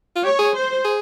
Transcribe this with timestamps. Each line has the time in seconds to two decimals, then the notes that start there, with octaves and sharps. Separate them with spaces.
0.16 F4
0.23 G4 C#5
0.39 G#4
0.54 C5
0.84 G#4